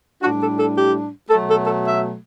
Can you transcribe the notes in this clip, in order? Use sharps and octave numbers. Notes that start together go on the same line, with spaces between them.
A2 G3 D4 F#4
A4
A4
G4
B2 F#3 A3 A4
A4
A4
E5